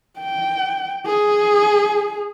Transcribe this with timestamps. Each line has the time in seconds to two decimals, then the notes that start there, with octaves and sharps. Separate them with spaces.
0.20 G5
1.06 G#4